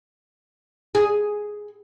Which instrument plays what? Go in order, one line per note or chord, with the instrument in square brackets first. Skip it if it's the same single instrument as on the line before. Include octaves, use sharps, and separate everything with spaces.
[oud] G#4